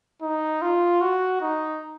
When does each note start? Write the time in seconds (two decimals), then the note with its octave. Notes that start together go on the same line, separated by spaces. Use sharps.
0.22 D#4
0.62 F4
1.01 F#4
1.41 D#4